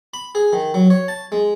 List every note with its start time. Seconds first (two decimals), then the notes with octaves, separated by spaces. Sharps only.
0.14 B5
0.35 G#4
0.53 D#3
0.74 F#3
0.90 C#5
1.08 A5
1.32 G#3